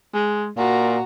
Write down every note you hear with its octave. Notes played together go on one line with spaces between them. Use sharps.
G#3
A#2 F#4 A#5